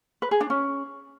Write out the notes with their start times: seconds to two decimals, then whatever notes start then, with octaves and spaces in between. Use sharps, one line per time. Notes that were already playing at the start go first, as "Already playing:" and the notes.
0.22 B4
0.31 G#4
0.41 D4
0.50 C#4